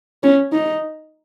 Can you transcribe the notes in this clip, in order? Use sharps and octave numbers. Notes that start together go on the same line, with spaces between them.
C#4
D#4